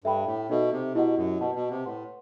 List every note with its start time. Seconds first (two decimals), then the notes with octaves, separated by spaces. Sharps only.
0.04 G2 A4 E5 G5 B5
0.26 A2
0.50 B2 D#4 A4 E5
0.72 C3
0.94 B2 E4 G4 D#5 F#5
1.18 F#2
1.40 B2 B4 D#5 F#5 A5
1.55 B2
1.70 C3
1.86 A2 B4 F#5 C6